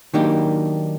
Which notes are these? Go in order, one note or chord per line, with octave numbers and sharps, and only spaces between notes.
D#3 F#3 A#3 D4 D#4 G4